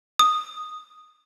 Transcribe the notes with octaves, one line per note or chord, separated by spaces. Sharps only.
D#6